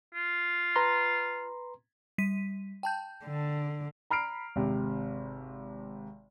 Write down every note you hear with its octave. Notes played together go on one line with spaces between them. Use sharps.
F4
B4 A#5 C6
G3 B6 D#7
G5 A5 G6
D3
A#5 B5 F6 C7 D7
G#1 C3